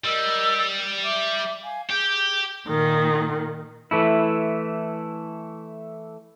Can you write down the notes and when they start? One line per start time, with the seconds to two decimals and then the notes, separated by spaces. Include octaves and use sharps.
0.04 G3 A#4 D#5 E6
1.03 E5 D6
1.62 F5 G#5
1.90 G4 G#4 G6
2.68 A#2 D#3
3.91 E3 A3 E4